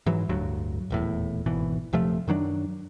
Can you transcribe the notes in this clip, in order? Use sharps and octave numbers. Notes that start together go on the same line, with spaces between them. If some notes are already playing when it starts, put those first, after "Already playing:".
G#2 E3 F#3
D1 D2 G2 F#3
D#1 E2 A2
G#1 B2 E3
D#1 C3 F3 A3
F#2 D#3 F#3 D4